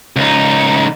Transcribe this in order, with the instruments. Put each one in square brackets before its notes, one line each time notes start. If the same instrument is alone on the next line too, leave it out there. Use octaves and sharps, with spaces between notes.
[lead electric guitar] C#2 D#4